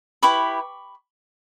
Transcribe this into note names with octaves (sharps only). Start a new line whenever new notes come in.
E4 G4 B4 B5 C#6